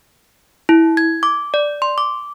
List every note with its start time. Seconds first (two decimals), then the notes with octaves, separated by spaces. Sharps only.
0.69 E4
0.97 G#6
1.23 D6
1.54 D5
1.82 C6
1.98 D6